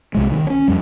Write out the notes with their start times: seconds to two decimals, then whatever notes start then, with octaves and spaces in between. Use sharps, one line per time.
0.15 C2 A#2 G#3
0.31 D#3
0.50 C#4
0.68 F2 G3